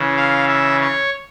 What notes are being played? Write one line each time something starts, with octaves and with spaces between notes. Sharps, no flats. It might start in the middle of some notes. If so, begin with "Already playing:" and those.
Already playing: C#3 E3
F5
E5
C#5